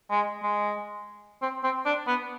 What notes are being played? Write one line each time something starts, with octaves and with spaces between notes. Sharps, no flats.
G#3
G#3
C4
C4
D4
B3